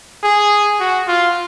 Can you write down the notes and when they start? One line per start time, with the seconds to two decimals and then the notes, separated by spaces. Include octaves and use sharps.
0.23 G#4
0.80 F#4
1.08 F4